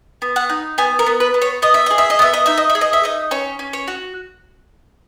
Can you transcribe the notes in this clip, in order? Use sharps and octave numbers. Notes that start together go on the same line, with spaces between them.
B3
F#5
D#4
B3 G#5
A#4
B3
B4
B3
C#5
B3 D#5
E5
G#4 D#5
E5
D#5
B3 E5
D#5
D#4 E5
D#5
E5
G#4
D#5
E5
D#4 D#5
C#4 C#5
C#4
C#5
F#4